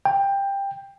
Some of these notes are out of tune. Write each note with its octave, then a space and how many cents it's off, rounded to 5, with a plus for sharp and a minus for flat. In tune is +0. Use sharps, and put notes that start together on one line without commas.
G5 +15